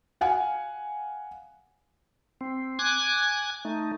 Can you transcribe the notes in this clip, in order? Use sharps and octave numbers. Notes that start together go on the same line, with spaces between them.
F5 F#5 G#5
C4
G#5 D6 F#6 G#6
A3 D#4